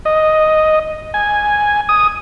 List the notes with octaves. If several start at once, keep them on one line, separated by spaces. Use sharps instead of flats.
D#5
G#5
D#6